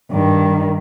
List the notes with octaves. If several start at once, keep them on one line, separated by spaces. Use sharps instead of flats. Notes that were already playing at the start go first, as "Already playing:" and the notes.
G2 D#3